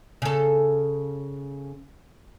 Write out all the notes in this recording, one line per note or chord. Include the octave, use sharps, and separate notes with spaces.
C#3 A4